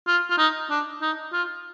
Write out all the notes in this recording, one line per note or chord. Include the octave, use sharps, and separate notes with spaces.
F4
F4
D#4
D4
D#4
F4